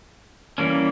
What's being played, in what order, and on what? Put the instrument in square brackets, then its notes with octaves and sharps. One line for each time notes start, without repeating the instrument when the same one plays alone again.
[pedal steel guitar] E3 G3 A#3 C#4